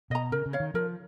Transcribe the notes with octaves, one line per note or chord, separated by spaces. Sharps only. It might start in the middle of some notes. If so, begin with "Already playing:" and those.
B2 D#5 A#5
C#3 A#4
C#3
C#5 F5
D#3
F3 A#4